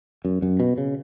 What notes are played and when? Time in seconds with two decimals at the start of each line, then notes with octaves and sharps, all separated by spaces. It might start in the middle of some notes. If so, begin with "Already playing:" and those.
0.25 F#2
0.42 F#2
0.60 B2
0.78 C#3